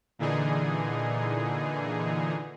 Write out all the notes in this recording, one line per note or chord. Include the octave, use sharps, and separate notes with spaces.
A#2 D3 E3 D#4 G#4